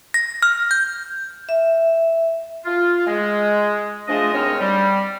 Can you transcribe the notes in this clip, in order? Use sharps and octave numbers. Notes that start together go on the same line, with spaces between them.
A#6
F6
G6
E5
F4
G#3
F3 G#3 A3 D4 D#5
D#2 G#2 C4 C#5 D#5 F6
G3